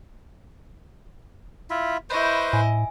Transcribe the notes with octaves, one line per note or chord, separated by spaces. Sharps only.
E4 F4 E5
E4 B4 C5 D#5 C#6 G6
A2 G#5